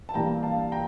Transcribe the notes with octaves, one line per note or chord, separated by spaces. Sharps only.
A5
G2 E3 A#3 G5 A#5
F5 A5
G5 A#5